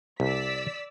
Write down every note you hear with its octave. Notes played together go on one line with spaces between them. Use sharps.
C2 D5 E6 B6